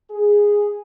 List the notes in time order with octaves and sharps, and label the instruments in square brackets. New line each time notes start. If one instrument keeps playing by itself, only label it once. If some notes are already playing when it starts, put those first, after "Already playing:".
[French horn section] G#4